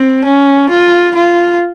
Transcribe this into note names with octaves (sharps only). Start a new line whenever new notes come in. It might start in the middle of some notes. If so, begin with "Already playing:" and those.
Already playing: C4
C#4
F4
F4